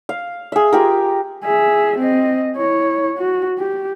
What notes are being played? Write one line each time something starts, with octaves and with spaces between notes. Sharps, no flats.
F5
G#4 E5
F4 G4 A#4
G#4 E5
C4 D#5
E4 C#5
F#4
G4